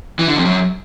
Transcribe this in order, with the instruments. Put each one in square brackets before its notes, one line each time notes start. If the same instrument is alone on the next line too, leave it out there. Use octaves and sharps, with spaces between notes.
[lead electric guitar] E3
D3
F2
F#2